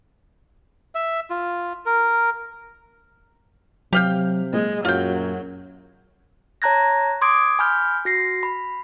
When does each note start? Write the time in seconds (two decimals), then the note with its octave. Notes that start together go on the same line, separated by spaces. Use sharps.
0.95 E5
1.30 F4
1.86 A#4
3.93 C3 F#3 G4 F5 G5
4.53 A#2 G#3
4.85 F#2 F#3 F4 G5
6.62 C#5 A5 A#5 F#6 G#6 A#6
7.21 C6 D6 D#6 G#6 D7
7.59 G#5 B5 F6 G6
8.05 F#4 A#6 C7
8.43 B5